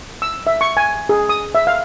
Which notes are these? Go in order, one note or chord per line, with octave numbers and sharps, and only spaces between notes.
E6
E5
C#6
G#5
G#4
D#6
E5
F5